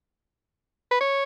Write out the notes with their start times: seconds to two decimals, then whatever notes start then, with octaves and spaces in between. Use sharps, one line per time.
0.91 B4
1.01 C#5